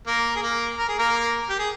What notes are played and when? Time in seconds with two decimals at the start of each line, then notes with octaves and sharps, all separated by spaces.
0.07 A#3 A#4
0.36 G#4
0.42 A#3 A#4
0.78 A#4
0.88 G#4
0.98 A#3 A#4
1.49 G4
1.59 G#4